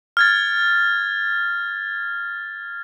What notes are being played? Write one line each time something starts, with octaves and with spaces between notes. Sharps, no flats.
F6 G#6 A6